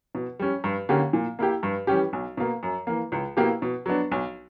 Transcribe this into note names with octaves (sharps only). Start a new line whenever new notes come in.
B2
G3 C#4
G2
D3 A#3 C#4 G4
A#2
A#3 E4 G4
G2
E3 G3 C#4 G4
B1
B2 A#3
F#2
E3 A#3
C#2
B2 A#3 E4 G4
B2
F#3 B3 D4
B1